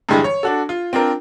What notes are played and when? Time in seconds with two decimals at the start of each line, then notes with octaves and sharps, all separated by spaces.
0.09 G2 D3 E3 G3 G#3
0.24 C#5
0.43 D4 F#4 A4
0.69 F4
0.93 C4 D4 F4 A#4